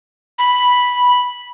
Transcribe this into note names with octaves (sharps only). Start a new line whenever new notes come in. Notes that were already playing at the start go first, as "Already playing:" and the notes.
B5